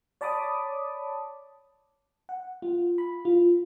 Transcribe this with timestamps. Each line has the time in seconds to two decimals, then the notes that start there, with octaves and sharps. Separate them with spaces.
0.21 C#5 D5 A5 B5 D6 D#6
2.29 F#5
2.62 F4
2.98 B5
3.25 F4